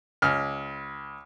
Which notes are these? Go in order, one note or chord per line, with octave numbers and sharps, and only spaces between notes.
C#2 F6